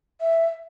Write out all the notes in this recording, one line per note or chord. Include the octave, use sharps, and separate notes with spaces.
E5